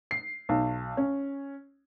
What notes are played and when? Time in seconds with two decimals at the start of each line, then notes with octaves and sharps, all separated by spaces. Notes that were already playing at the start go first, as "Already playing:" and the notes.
0.11 C7
0.49 B1
0.97 C#4